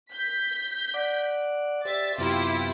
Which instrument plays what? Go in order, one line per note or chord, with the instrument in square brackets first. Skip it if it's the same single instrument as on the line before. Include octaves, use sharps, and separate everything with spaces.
[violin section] G6 B6
[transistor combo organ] D5 F#5 D6
[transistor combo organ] G4 C5 D5 [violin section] E5 A6
[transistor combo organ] F#2 C3 B3 [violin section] E4 F4 G4